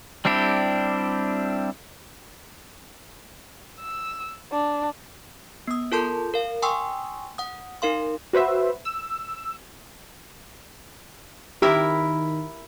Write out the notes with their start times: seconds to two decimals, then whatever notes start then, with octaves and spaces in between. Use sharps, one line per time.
0.25 G3 C4 D4 E4 G4
3.81 E6
4.52 D4
5.68 B3 D#6
5.92 F4 A4 A#4 A5 C6 G6
6.34 A#4 F5
6.62 G5 G#5 C6 C#6 D#6 E6
7.38 F#5 D#6
7.82 D#4 A#4 F5 C6
8.33 F#4 B4 C5 E5
8.85 E6
11.62 D#3 E4 G4 A#4 E5